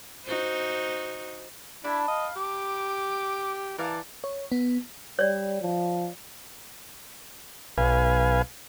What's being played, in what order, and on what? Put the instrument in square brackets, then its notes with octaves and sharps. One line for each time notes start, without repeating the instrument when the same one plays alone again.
[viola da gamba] D#4 F#4 C5
[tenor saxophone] D4 [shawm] E4 [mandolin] A5 B5
[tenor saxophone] D#5 [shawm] F5
[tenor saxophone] G4 [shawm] D6
[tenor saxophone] E3 [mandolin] A#4 F5 A5 [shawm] D5
[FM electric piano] C#5
B3
[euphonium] G3 [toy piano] C#5 D5
[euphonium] F3
[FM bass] B1 [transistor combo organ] B4 F5 G#5